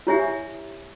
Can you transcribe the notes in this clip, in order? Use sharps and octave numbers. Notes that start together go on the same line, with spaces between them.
E4 G4 C#5 E5 G#5